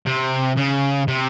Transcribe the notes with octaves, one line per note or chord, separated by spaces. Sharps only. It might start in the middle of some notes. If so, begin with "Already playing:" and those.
C3
C#3
C3